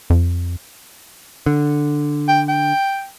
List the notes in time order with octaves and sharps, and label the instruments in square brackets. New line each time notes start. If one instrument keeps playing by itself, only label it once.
[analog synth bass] F2
[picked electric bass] D3
[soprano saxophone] G5
G5